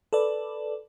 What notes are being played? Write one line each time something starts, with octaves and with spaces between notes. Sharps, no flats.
A4 B4 D5